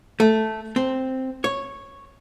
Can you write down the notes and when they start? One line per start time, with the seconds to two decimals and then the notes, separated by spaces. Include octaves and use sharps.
0.20 A3
0.76 C4
1.44 C#5